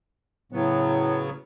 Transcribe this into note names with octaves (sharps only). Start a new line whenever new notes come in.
A2 C#3 F#3 B3